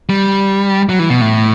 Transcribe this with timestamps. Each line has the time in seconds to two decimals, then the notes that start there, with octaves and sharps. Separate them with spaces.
0.10 G3
0.89 F#3
0.99 E3
1.10 B2
1.21 A2